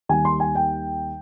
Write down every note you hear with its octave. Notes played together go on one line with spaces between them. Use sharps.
D#2 D#3 G3 G#5
C6
G#5
G5